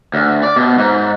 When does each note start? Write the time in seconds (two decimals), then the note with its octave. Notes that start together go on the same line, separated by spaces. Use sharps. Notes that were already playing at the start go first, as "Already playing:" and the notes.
0.14 D2
0.43 D5
0.56 B2
0.78 G#2